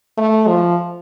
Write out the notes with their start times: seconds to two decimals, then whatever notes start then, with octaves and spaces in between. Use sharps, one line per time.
0.18 A3
0.48 F3